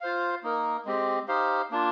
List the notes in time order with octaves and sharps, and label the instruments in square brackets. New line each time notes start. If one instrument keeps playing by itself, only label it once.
[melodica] F4 C5 F5
A#3 D#4 A#4
G#3 C4 G4
D#4 G4 C5 F5
A#3 D4 F4